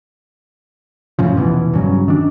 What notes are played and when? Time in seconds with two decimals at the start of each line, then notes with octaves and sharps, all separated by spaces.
1.19 F#2 A2 C#3 F3
1.37 F1 B2 E3
1.73 G2 C#3 F#3
2.08 D#3 D4